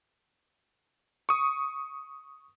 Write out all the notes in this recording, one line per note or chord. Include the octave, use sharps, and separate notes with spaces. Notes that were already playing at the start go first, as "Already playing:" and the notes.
C#6 D#6